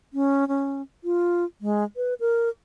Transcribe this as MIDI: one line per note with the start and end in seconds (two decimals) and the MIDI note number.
0.13 0.48 61
0.48 0.82 61
1.04 1.44 65
1.61 1.84 56
1.96 2.14 71
2.20 2.49 70